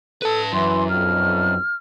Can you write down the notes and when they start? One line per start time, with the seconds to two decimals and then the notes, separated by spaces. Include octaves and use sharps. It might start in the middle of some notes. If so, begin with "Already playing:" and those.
0.22 A4 B4 A5
0.53 F#2 E3 C6
0.90 B1 F2 F6